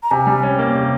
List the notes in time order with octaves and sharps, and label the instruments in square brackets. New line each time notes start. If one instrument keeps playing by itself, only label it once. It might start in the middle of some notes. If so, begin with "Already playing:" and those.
[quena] A#5
[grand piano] C3 [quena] G#5
[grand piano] G3
C#4
A#3
C3